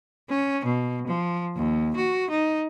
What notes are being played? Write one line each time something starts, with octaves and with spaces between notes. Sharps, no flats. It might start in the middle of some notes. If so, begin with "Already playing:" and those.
C#4
B2
F3
D#2
F#4
D#4